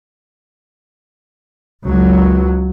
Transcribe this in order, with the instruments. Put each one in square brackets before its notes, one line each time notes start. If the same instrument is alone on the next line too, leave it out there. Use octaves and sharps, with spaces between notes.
[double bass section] C#2 F#3